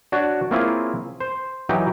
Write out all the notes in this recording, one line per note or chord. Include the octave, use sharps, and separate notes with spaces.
D4 F#4 C#5 D5
A#3 C4 C#4 E4 F4 G#4
C5
E3 F#3 D#4 G4 G5